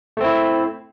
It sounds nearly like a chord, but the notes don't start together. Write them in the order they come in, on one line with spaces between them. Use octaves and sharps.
A3 C4 E4